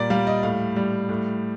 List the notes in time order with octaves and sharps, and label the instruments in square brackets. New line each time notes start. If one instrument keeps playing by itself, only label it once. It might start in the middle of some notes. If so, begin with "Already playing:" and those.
Already playing: [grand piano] A#2 G3 A#4 D5
G3 F5
D#5
A2 F5
G3
A2